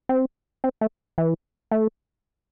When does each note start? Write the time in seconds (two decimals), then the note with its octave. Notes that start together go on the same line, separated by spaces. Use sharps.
0.09 C4
0.64 C4
0.81 A3
1.18 E3
1.71 A3